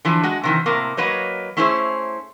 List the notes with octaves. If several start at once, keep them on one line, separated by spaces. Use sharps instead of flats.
D3 E3 F3
G#3 F#4
C3 D#3 E3
A2 C3 A#3
F#3 A#3 B4 C#5 D#5
A3 C#4 E4 G#4 C5